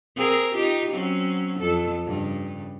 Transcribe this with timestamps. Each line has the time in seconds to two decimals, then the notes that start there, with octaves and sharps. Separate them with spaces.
0.16 C4 G#4 A#4
0.54 D#4 F4 G4
0.91 F#3 C4 C#4
1.59 F2 A4
2.07 G2 C#3